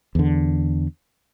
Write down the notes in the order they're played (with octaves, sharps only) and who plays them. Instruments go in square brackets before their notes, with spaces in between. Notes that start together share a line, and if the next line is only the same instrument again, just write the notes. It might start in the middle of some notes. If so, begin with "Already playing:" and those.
[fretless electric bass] E2 D3